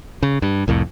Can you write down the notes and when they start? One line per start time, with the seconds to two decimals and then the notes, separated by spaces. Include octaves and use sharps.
0.23 C#3
0.42 G2
0.68 C2 F2 A2